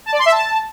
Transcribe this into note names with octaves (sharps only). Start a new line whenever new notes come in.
A5
D5
C6
E5
A5